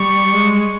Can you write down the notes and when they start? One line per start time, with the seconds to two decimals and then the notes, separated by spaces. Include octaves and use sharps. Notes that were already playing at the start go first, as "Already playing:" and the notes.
Already playing: G3 C#6
0.33 G#3